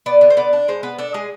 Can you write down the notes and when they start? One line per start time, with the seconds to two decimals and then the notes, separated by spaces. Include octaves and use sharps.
0.06 B3 D5
0.21 D3
0.30 C5
0.37 B3 D5
0.53 D4
0.68 G#3 C5
0.83 B3 B4
0.98 D4 A4
1.14 G#3 G#4